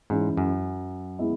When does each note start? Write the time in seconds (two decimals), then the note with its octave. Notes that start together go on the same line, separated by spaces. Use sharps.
0.10 G#2 E3 G#3 C#4 E4
0.37 F#2
1.19 G#3 B3 E4